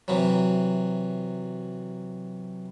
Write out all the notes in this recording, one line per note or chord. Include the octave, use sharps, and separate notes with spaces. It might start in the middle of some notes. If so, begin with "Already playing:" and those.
C3 E3 F#3